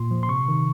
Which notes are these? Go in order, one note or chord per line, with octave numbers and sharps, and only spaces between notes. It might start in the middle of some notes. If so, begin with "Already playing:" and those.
Already playing: A#2 C6
F3
C6
C3 C#6
D#3